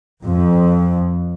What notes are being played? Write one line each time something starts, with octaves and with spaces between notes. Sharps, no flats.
F2